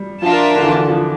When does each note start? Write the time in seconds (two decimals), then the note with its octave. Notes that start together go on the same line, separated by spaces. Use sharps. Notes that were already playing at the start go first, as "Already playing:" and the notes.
Already playing: G3
0.22 F3 D4 F4 A#4 E5 A5
0.56 D3
0.63 E3
0.71 D3
0.89 F3